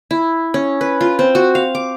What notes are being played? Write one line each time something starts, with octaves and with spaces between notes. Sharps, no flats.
E4
C#4
B4
F4
C4
F#4
F5
D6